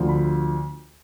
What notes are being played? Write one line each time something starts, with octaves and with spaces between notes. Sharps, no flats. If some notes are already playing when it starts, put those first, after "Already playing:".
Already playing: D2 D3 F3
B5